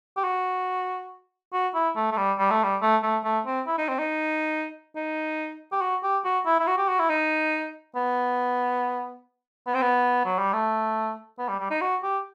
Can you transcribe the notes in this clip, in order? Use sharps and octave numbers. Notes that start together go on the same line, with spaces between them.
G4
F#4
F#4
E4
A3
A3
G3
G3
A3
G3
A3
A3
A3
C4
E4
D#4
C4
D#4
D#4
G4
F#4
G4
F#4
E4
E4
F#4
G4
F#4
E4
D#4
B3
B3
C4
B3
F#3
G3
A3
B3
G3
G3
D#4
F#4
G4